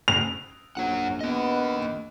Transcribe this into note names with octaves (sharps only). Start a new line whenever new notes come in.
F7
A#1 F#2 C#5 F#5
A#3 B3 D#5